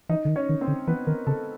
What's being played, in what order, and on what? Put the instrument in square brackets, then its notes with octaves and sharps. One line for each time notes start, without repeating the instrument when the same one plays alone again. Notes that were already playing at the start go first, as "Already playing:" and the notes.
[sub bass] E3 [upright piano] D#4 D#5
[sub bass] D3
D#3
[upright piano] C#4 C#5
[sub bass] D#3
[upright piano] C4 C5
[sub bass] D3
[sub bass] E3 [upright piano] B3 B4
[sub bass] D#3 [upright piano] A#4
[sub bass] C#3 [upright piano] A4